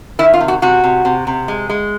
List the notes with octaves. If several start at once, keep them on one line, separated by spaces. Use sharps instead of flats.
D#3 E4
F4
C3
F#4
C3 F#4
C3
C3
C3
G#3
G#3